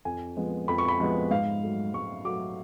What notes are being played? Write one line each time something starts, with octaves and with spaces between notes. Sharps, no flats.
F2 G#5
F3 G#3 B3
F2 B5
C#6
B5
F3 G#3 B3
G#2 F5
F#3 A3
G#2 C#6
F#3 A3 D6